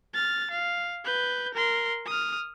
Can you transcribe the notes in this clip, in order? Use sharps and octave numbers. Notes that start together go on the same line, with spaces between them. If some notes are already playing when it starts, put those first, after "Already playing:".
F6 A6
F5
B4 G6
A#4 C6
D#6 F6